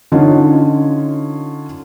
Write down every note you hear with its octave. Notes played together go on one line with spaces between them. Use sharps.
D3 C#4 D#4 F4